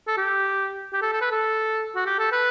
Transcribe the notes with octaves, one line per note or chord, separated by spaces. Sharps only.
A4
G4
G4
A4
A4
B4
A4
F#4
G4
A4
B4